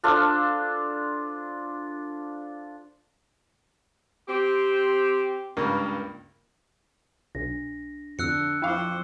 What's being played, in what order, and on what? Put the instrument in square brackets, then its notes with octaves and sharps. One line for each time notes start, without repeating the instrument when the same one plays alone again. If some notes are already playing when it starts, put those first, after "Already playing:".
[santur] D4 F4 A4 C5
[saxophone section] C4 G4
[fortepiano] C#2 G2 A#3
[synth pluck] B1 [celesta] D4 A#6
[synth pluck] F2 [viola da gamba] D3 [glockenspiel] E6 F#6 C#7
[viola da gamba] F2 F3 C5 [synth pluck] E4 F5 [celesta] G5 C#6 D6